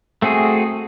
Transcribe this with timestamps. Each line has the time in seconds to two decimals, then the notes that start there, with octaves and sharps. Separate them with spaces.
0.22 A3 C4 F#4 G#4